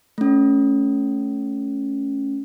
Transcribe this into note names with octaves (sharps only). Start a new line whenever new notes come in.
A3 C#4